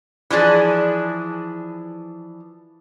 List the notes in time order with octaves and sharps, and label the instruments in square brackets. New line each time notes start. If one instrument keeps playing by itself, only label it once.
[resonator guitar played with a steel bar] E3 F3 D4 G#4